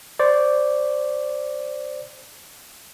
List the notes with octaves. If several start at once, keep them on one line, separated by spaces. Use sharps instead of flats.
C5 D5